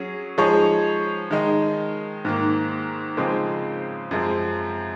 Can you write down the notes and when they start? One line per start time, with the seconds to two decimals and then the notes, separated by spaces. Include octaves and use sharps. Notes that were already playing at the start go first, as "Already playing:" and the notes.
Already playing: F#3 C#4 G#4
0.38 F3 G#3 D#4 G#4 C#5
1.31 D#3 G#3 D#4
2.25 G#2 D#3 A#3
3.17 C#3 F3 G#3 C4 D#4
4.11 F#2 F3 G#3 C4